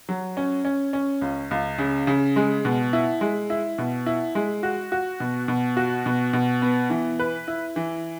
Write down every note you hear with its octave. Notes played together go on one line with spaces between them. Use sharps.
F#3
C#4
C#4
C#4
C#2
C#2
C#3
C#3
G#3
B2
E4
G#3
E4
B2
E4
G#3
F#4
F#4
B2
B2
F#4
B2
B2
B3
E3
B4
E4
E3